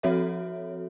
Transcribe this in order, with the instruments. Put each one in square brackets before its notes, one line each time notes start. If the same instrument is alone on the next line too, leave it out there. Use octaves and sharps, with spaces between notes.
[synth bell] F3 C4 F#4 A4 C#5 E5